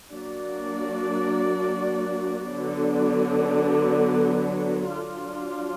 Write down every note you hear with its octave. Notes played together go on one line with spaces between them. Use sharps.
F#3 A#3 D4 F#4 D5
D3 F#3 B3 D4
F#3 D4 F4